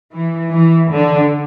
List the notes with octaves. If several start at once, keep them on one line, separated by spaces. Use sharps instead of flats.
E3
E3
D3